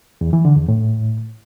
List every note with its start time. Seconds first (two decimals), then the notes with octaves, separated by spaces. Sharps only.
0.21 E2
0.33 E3
0.45 D3
0.57 E2
0.68 A2